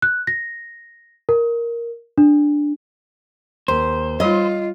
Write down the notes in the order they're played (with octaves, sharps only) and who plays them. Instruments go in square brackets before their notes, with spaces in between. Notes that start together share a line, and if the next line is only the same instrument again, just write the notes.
[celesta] F#6
A#6
A#4
D4
[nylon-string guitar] D#2 [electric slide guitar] C5
[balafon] G3 D#4 C#5 [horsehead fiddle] F4 [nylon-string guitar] D#5